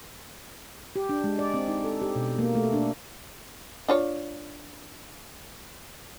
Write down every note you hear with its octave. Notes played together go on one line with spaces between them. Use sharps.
G4
D4
G#3
D5
C4
D#4
A4
G4
B2
A#3
A3
D4
D4 F4 C#5